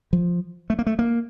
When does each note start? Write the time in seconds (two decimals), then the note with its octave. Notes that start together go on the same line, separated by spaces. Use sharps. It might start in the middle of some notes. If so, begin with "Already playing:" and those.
0.13 F3
0.70 A3
0.79 A#3
0.87 A3
0.99 A#3